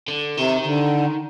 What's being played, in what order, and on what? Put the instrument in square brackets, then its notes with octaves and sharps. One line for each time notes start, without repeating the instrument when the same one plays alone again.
[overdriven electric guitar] D3
[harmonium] C3 [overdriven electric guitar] D#3
[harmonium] D3